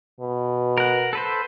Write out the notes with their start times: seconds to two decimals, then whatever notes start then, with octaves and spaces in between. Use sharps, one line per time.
0.20 B2
0.78 A#4 F#5
1.13 A4 B4 C5